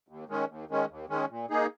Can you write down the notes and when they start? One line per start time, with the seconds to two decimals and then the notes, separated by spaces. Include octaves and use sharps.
0.08 D#2
0.29 D#3 G#3 C#4
0.49 D#2
0.70 D#3 G#3 C#4
0.89 D#2
1.09 D#3 G#3 C#4
1.30 A#2
1.50 A#3 D#4 G#4